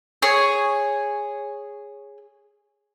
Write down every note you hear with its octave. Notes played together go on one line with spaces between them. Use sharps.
G#4 C#5